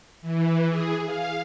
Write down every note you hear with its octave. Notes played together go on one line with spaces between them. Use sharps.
E3
G#4
F5